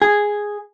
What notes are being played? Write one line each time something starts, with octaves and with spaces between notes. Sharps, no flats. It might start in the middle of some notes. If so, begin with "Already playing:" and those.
G#4